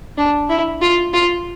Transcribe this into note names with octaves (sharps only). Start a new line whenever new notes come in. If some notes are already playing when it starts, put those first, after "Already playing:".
D4
E4
F4
F4